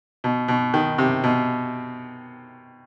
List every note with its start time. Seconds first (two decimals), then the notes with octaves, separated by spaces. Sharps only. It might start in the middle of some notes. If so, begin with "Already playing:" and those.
0.24 B2
0.48 B2
0.74 D#3
0.98 C3
1.24 B2